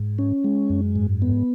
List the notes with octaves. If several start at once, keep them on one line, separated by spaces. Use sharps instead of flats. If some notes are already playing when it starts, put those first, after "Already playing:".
Already playing: G#2
C#4
G#3
F#2
G#2
B3